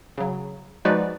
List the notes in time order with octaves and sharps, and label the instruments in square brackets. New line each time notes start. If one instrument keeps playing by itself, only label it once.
[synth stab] C#3 F#3
F3 G#3 D#4 F#4 B4 D5